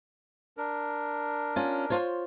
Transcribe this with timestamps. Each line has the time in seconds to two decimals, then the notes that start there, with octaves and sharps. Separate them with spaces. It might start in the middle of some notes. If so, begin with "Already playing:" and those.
0.57 D4 A#4
1.56 C#4 F4
1.90 F4 C5 C#5